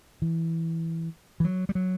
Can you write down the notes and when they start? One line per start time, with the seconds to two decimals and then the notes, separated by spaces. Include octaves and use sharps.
0.22 E3
1.40 E3
1.44 F#3
1.69 G3
1.75 F#3